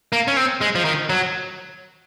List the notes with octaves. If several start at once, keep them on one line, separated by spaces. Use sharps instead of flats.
A#3
C#4
C4
G#3
F3
D#3
F#3